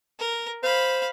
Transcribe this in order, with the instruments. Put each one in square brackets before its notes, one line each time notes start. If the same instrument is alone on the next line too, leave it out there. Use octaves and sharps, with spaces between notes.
[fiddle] A#4
[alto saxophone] C5 [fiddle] F5 B5